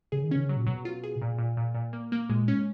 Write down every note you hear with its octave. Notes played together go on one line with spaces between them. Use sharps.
C#3 G#4
D#3
C#3 C#4
F#3
A#2
B2 F#3
F4
G#4
A#2
A#2
A#2
A#2
A#3
A#3
A#2 G#3
C#4